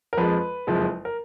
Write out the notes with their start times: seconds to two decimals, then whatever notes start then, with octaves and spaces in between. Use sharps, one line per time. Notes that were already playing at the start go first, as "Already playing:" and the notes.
0.13 A#4
0.17 F2 F3 G#3 B4
0.67 F#1 F2 F3 G#3
1.05 A#4